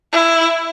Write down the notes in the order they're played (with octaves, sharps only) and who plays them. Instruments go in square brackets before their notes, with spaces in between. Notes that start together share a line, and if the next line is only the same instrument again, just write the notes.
[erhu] E4